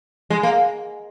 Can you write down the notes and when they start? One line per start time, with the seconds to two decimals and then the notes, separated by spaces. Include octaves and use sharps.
0.30 G#3
0.43 A#3